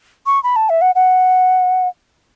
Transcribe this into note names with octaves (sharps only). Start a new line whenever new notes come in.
C#6
B5
A5
E5
F#5
F#5